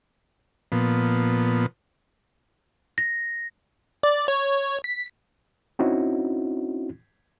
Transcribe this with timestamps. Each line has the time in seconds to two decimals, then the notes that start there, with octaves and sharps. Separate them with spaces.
0.72 A#2 F3 B3
2.98 A#6
4.03 D5
4.28 C#5
4.84 B6
5.79 C4 C#4 D#4 E4 F#4